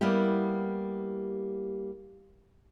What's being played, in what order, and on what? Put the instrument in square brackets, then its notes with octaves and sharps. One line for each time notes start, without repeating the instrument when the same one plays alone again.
[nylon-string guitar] G3 A#3 B3 E4 G4